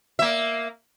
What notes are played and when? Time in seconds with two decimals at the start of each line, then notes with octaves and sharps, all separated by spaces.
0.19 A#3 E5